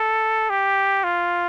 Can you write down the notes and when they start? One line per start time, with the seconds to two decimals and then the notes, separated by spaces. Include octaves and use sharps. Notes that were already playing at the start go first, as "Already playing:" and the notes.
Already playing: A4
0.50 G4
1.04 F4